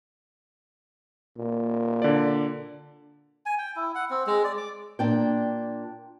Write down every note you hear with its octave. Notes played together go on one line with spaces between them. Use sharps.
A#2
D3 D5
G#5
G5
E4
F#5
C4
G#3
D5
D6
A#2 D4 G5